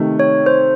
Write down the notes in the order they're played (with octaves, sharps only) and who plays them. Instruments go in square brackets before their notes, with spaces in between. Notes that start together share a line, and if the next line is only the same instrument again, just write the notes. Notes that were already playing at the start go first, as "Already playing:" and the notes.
Already playing: [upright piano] C3 D#3 A3
[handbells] C#5
C5